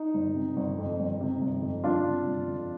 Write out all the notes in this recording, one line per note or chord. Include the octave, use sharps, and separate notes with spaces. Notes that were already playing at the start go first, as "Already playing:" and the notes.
Already playing: D#4
G1
C3
G1
F2
G1
C3
G1
F2
G1 D4 F4
C3
G1
F2